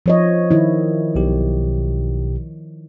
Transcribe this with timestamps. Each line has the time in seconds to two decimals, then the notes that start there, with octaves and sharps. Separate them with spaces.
0.06 F3 C#5 D#5
0.51 D#3 E4
1.15 B1 B2 G4